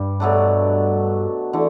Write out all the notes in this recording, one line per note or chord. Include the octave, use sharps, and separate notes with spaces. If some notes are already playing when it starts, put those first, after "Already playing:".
Already playing: G2 G3
B2 F#3 A3 D4
D3 E3 A3